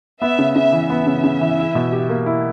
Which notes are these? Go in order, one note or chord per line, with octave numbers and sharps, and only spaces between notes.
B3 E5
C#3
C#3 E5
E3
B3 E5
C#3
C#3
E3
E4
B2
G4
A#3
E4